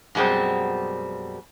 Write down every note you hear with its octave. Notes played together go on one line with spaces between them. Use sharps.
F#2 B2 G3 G#3 C4